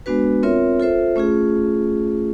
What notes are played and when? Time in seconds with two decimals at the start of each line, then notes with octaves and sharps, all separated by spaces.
0.06 G#3 B3 D4 F#4 B4
0.43 C4 F4 A#4 C#5 E5
0.80 F4 A4 C5 E5
1.16 A3 C#4 F4 G#4